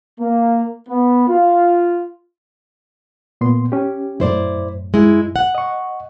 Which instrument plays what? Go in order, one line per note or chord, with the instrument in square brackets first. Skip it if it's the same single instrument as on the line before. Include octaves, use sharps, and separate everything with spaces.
[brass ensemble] A#3
B3
F4
[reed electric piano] A#2 B3 C6
C#4 G4
[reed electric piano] F#2 A2 [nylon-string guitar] E4 C5 D5
[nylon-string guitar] G#3 E4
F#5
[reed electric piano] D#5 C#6